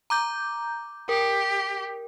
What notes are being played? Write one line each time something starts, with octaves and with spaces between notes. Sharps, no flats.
A#5 D6 G6
G4 A#4